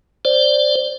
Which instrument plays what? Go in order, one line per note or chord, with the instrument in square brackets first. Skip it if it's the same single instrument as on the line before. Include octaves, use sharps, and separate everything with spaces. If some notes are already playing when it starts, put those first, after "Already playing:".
[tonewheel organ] C5 D5